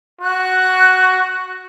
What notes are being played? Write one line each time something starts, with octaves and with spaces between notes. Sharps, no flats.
F#4 F#6